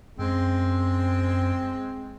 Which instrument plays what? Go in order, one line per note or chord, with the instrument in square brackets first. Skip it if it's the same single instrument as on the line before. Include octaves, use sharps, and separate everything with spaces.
[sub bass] F#2 [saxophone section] G#3 C4